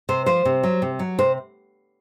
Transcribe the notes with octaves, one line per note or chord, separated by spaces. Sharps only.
C3 C5
F3 C5
C3
F#3
C3
F#3
C3 C5